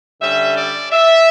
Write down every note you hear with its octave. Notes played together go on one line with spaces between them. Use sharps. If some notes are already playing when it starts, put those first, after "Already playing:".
D3 G3 C#4 E5
D5
E5